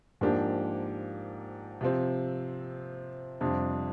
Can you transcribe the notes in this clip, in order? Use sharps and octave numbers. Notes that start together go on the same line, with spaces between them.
G#2 F3 A#3 D4 G4
C3 F3 C4
F2 C3 G3 D4